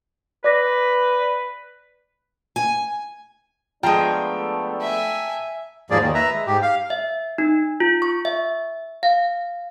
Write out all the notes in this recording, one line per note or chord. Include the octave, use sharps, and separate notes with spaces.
B4 D5 D6 A#6
G#5
F3 G#3 A3 B3 D4 G5 A5 A#5
E5 G#5
D#2 G#2 F3 A#3 G#4 D5
D#2 D#3
B4 E5 A#5
G#3
G#2 G4
F5
E5
D#4
F4
C#6
E5
F5